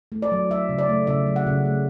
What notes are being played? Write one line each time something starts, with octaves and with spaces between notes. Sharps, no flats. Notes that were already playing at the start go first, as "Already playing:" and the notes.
A3
D5
F#3
F#3 E5
C#3
D5
A3
C#3 E5
F#3
F#5
C#3
A3